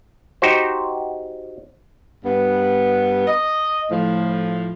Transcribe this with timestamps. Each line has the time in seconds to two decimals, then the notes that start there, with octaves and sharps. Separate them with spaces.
0.42 D#4 F#4 G4 C5
2.25 G2 B3
3.27 D#5
3.91 A2 F3